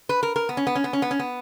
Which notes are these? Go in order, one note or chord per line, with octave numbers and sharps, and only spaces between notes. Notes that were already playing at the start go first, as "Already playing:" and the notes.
B4
A#4
A#4
B3
C#4
B3
C#4
B3
C#4
B3
C#4
B3